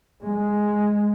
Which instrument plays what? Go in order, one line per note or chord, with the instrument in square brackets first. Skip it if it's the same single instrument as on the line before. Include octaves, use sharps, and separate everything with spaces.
[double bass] G#3